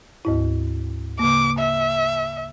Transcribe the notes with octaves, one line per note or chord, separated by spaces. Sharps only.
D2 G#2 E4
C#3 A#3 D6
E5